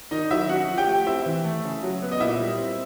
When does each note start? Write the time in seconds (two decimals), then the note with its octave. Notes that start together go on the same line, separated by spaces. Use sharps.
0.11 D#3 D#4 D#5
0.31 F#3 E4 E5
0.49 C#4 F#4 F#5
0.68 F3
0.78 G4 G5
0.87 A3
1.06 C4 E4 E5
1.26 E3
1.44 A3
1.64 C#3
1.83 F#3
2.02 B3
2.12 D#5
2.20 A#2 E4 E5
2.40 G3
2.59 C4